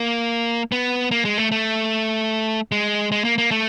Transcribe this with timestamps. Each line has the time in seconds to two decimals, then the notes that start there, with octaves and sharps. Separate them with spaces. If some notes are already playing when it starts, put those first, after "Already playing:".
Already playing: A#3
0.72 B3
1.11 A#3
1.25 G#3
1.38 A3
1.52 A3
2.72 G#3
3.12 G#3
3.24 A#3
3.38 A#3
3.51 A3